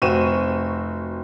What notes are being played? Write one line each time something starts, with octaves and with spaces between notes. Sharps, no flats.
F1 C4 F#4 C#6 D#7 E7